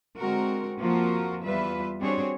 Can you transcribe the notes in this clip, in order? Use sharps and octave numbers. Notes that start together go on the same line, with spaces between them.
D3 G#3 C4 F#4 A#4
F2 F3 A#3 F4 F#4 A#4
E2 G3 F4 B4 E5
G3 C4 D4 F#4 G#4 C#5